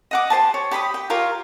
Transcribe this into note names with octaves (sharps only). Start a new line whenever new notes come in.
D#5 F#5 D6
G4 C5 G#5 A5
C#5
G4 B5 C6 D#6
G5
F4 G4 A#4 C#5